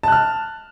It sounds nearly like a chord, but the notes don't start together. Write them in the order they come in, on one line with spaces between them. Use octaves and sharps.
A5 F#6 F6